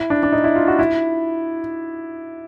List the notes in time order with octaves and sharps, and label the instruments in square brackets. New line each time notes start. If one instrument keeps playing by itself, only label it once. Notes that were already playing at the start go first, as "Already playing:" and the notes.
Already playing: [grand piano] E4
D4
D4
D#4
E4
F4
F#4
E4